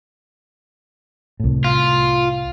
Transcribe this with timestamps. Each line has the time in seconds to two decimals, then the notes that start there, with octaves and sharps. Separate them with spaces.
1.40 C2 A2
1.64 F4